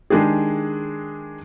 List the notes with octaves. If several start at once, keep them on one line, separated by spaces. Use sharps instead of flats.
D#3 G#3 D4 G4 G#4